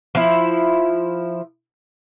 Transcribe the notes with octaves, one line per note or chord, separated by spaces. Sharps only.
F3 E4